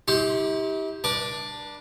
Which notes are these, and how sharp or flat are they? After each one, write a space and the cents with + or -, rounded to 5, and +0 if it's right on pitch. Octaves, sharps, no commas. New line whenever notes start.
E4 -45 G4 +0 C6 +15
D4 +5 B4 -45 D6 +0